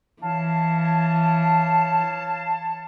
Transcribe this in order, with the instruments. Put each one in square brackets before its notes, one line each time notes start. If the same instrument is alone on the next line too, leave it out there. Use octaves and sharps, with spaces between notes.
[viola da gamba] E3 [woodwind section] C#5 F5 A5